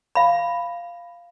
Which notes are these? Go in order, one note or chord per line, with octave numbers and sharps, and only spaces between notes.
F5 B5